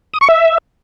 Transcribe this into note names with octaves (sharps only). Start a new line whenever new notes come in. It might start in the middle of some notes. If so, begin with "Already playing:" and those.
D#6
C#6
E5